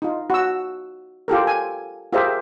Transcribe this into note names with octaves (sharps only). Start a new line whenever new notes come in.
D#4 F4
F#4 E6
F4 G4 A4 A#4
G#5
F4 G4 G#4 A#4 C5 E5